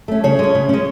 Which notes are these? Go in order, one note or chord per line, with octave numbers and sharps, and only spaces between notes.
A3 C#4
C#3 C#5
G#3 C#4
C#3
G#3 C#4